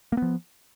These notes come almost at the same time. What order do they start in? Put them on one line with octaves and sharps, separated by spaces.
A#3 B3 F3